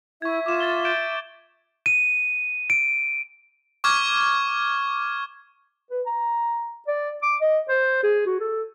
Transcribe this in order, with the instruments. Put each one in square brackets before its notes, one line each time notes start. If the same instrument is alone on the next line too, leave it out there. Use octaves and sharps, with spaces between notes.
[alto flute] E4 [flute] E5 [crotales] C#6 G#6
[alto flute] F4 [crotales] D6 E7
[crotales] A6 G7
G6 D7 E7
[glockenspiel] D#7
D7
[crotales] C#6 D6 F6 G#6
[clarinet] B4
A#5
D5
D6
D#5
C5
G#4
F#4
A4